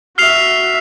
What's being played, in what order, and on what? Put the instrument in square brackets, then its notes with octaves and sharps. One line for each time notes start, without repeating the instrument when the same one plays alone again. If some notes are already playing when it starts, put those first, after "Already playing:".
[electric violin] F#4 E5 [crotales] F6 C7 F7